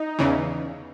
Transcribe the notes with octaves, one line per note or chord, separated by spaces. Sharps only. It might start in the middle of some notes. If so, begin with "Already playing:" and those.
Already playing: D#4
E2 C#3 E3